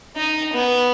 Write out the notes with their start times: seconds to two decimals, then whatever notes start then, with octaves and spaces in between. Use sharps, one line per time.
0.16 D#4
0.53 B3